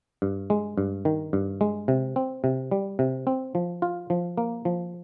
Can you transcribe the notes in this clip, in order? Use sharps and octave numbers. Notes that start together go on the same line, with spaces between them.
G2
G#3
G2
D#3
G2
G#3
C3
C4
C3
G3
C3
C4
F3
F4
F3
A#3
F3